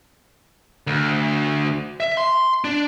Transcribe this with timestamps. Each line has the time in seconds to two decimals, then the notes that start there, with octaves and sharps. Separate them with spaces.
0.87 D2
2.00 E5
2.17 C6
2.64 D4